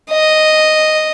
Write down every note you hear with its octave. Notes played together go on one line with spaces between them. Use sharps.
D#5